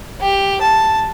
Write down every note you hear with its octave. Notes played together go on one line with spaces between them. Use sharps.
G4
A5